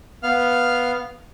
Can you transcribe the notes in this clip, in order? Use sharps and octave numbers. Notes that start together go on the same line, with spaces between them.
B3 F5 F6